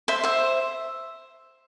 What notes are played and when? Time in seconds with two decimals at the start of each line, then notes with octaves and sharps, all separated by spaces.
0.08 C5 E5
0.24 C5 E5